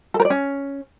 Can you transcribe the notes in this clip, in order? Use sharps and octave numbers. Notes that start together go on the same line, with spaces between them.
A4
A#4
D5
C#4